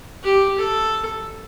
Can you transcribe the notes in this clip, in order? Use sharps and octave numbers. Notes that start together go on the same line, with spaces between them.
G4
A4